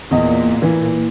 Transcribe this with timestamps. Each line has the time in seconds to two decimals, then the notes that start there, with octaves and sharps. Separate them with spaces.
0.11 E2 A#2 D#5
0.62 E3